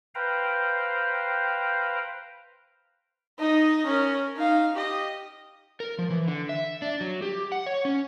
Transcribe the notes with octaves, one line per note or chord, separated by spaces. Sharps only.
B4 C5 F5 G5 A#5
D#4 D#5
C#4 A#4
D#4 F5
G4 D#5
A#4
F3
E3
D3
E5
D4
F#3
G4
F#5
C#5
C#4